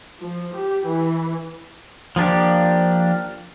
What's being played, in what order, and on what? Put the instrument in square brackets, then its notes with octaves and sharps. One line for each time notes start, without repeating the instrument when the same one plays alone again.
[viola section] F3
G4
E3
[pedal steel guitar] F3 A#3 D4 G4